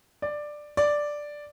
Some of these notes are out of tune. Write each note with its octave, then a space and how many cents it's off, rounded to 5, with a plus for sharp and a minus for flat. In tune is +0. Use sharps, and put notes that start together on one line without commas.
D5 +10
D5 +0